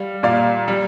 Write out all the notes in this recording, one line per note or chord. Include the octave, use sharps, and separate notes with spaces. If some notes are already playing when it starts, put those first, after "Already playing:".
Already playing: G3 F5
A#2 D5 F5
G3